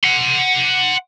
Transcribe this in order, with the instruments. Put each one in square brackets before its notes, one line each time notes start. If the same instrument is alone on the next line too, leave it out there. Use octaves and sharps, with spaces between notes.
[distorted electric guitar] F#5 C6